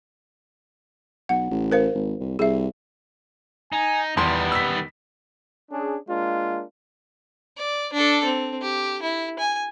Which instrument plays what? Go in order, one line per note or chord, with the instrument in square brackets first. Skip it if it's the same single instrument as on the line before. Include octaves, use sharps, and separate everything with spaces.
[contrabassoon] B1 [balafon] F#5
[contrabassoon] A1
[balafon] A#4 C5 F5
[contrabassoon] G#1
C2
[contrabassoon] C2 [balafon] G#4 E5
[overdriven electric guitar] D#4 [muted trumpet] G#5
[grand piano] E2 C6 [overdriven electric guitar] D#3 G3 [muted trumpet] B3
[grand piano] E6 B6
[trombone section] C#4 D4 G#4
G#3 A#3 D4 F4
[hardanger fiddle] D5
D4 A4
C4
G4
E4
G#5